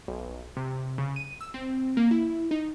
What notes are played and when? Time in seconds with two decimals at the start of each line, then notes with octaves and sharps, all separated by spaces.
0.08 B1
0.57 C3
0.98 C#3
1.16 D#7
1.41 E6
1.54 C4
1.97 A#3
2.11 E4
2.51 D#4